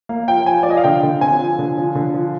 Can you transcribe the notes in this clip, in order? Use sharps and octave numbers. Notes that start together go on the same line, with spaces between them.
A#3 F5
F3 G5
F3 G#5
F3 D5
D#5
F5
D3 G5
D3
C4 G#5
F3
D3
F3
D3
F3